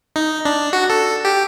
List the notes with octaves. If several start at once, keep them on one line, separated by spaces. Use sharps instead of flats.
D#4
D4
F#4
A4
G4